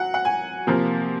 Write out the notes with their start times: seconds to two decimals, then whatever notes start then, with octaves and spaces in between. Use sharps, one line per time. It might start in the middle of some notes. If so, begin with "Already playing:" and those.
Already playing: F#3 F#5
0.14 F#5
0.25 G#5
0.67 C3 F3 A#3